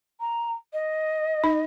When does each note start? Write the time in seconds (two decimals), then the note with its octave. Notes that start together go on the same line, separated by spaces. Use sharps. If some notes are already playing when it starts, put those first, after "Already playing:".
0.20 A#5
0.73 D#5
1.44 D#4